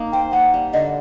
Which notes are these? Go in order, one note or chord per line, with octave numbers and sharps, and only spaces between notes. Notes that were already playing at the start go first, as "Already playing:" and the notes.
Already playing: A#3 D#4
C5 G5
A#3 F#5
G3
D3 D#5